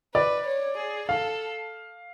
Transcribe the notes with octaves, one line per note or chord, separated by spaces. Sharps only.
B4 D5
C#5
G#4
A4 F5